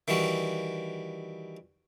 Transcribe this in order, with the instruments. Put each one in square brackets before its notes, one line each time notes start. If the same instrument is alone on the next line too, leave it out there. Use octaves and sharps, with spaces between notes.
[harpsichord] D#3 E3 G3 F#4